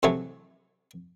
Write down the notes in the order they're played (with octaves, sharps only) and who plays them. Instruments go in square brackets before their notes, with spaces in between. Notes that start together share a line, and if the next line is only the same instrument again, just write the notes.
[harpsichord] A2 C3 E3 F#3 A3